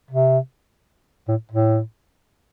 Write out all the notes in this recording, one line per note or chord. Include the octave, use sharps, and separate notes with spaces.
C3
A2
A2